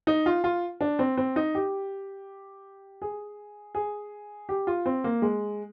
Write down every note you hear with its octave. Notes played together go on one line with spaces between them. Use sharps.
D#4
F4
F4
D4
C4
C4
D#4
G4
G#4
G#4
G4
F4
C4
A#3
G#3